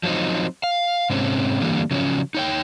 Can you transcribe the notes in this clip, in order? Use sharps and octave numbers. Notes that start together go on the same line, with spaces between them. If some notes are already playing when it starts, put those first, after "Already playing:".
F3 F#3 G#3 C4 D#4
F5
G#2 C3 C4 C#4
D3 E3 G3 A#3
C#3 F3 F#3 C#4
D#4 C#5 G5